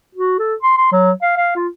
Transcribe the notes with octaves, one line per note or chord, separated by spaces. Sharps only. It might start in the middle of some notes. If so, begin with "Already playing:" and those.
F#4
A4
C6
C6
F#3
F5
F5
F4